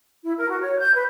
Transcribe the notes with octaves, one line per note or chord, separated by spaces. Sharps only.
E4
A#4
F#4
C#5
G6
B4